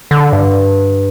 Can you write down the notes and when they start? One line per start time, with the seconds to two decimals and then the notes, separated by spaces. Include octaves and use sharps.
0.11 D3
0.33 G2